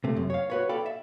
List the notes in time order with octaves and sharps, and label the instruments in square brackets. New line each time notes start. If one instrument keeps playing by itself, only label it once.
[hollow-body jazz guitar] C3 A3
F#2
C#5 F5
F#4 B4 C#5
A4 D5 F5 G5 B5
E5